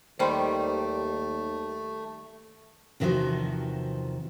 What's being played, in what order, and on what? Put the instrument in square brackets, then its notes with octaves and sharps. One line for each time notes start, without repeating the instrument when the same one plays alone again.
[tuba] D#2 [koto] D#3 G3 [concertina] A3 [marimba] C5 B5 C6
[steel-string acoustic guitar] E2 C3 D#3 F3 F#4 C5